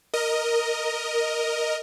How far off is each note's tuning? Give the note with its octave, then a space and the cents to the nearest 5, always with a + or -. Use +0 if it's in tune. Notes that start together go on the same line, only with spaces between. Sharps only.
A#4 +0 D#5 +0